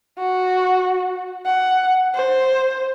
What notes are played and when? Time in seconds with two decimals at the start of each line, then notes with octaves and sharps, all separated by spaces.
0.19 F#4
1.45 F#5
2.15 C5